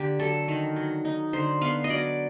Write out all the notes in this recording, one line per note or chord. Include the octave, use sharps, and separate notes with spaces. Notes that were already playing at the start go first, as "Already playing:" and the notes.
Already playing: D3 A#3 G4
F#3 A4
D#3
F#3
D#4
D3 C5
B3 F5
D#5
F#3 D5